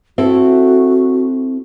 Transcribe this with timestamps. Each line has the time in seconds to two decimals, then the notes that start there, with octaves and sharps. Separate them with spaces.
0.18 C4 E4 F#4 A4